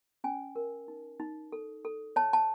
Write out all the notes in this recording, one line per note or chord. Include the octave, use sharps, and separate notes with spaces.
C#4 G#5
A#4
D#4
D#4
A4
A4
C#5 A5
A5